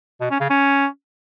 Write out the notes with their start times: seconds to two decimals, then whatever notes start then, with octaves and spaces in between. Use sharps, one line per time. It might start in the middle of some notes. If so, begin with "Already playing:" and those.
0.21 B2
0.31 C#4
0.40 C#3
0.50 C#4